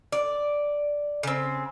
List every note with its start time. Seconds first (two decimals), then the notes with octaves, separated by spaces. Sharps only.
0.12 D5
1.23 C#3 C4